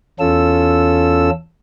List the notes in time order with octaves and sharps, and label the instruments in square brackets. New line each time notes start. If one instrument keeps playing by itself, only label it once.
[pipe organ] E2 C#4 F4 A4 E6